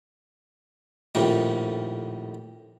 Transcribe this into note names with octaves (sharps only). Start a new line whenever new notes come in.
A#1 F2 A2 D#3 G3